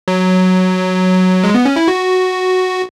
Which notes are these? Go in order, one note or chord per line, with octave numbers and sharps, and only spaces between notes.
F#3
G#3
B3
C#4
E4
F#4